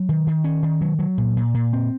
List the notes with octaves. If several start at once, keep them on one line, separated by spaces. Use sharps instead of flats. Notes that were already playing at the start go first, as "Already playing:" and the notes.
Already playing: F#3
D#3
D#3
C#4
D#3
F#3
F#3
A#2
A#2
A#2
C4